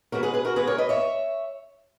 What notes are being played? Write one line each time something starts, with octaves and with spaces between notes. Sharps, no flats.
D#2 C#3 G#3 B3 F#4 A#4
G#4 B4
G#4 B4
F#4 A#4
D#2 C#3 G#3 B3 G#4 B4
A#4 C#5
B4 D#5
C#5 E5